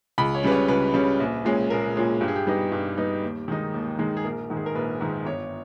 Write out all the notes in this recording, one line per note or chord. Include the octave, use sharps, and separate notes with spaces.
C#2 B5
C#5
C#3 G3 C#4 B4
C#5
C#2 B4
C#3 G3 C#4
A#1
A#2 G#3 C#4
A#1 A#4
A#2 G#3 C#4
G2 G4
G#4
G4
G3 B3 D#4
G2
G3 B3 D#4
D#2
D#3 G#3 D#4
D#2
D#3 G#3 D#4
G#4
A#1 A#4
G#2 D#3
G#4
A#4
A#1 B4
G#2 D#3
G1 C#5